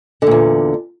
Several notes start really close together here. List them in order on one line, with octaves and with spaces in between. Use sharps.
D3 A#2 E2